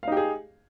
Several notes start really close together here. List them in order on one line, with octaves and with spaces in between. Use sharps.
F5 D#4 G4 G#4